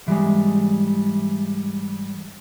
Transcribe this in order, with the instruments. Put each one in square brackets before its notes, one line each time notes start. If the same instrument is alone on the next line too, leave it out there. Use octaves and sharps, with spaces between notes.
[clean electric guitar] G#2 E3 F3 G3 G#3